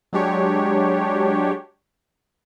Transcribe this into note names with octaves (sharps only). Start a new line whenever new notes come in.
F#3 G#3 D4 G4 C#5